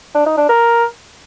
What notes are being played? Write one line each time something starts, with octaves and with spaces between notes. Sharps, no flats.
D4
D#4
D4
A#4